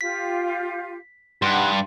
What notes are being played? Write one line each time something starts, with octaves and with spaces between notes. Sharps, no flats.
F4 G4 F5 B6
G2 D#4 F#5 C6 F#6